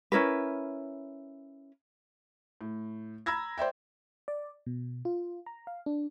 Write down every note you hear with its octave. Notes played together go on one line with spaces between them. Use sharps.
C#4 E4 A#4 B4
A2
A#5 B5 E6 G#6 A#6
C5 D5 E5 G5
D5
B2
F4
A#5
F5
D4